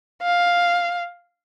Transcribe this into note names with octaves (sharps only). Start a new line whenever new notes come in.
F5